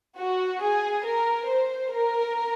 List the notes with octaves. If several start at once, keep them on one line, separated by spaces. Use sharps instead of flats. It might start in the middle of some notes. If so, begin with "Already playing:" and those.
F#4
G#4
A#4
C5
A#4